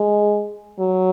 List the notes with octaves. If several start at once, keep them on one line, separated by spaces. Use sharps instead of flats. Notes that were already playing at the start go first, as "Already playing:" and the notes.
Already playing: G#3
F#3